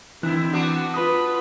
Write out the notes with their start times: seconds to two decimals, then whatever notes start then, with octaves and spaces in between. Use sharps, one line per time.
0.23 D3 E3 C4 E4 F#6
0.53 B3 D4 F#4
0.94 F4 B4 B5 D#6